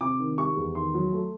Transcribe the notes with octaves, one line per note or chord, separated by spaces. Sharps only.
C3 D6
D#3
G3 C#6
E2
D#3 C6
F#3
A3